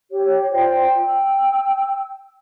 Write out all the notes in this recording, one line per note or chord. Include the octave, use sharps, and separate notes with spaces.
G4 C#5
F4 C5 D5 G5
G5 E6